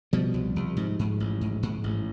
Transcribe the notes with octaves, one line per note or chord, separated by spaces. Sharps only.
B2 F3 G3
C2
C2
G#2
G#2
A1
G#2
G#2
A1